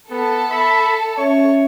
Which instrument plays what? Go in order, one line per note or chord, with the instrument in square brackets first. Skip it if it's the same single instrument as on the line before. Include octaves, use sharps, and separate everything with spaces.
[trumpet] B3 [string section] A4
[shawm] E5 [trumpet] B5
[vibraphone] C#4 E5 [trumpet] C#5 [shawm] C#6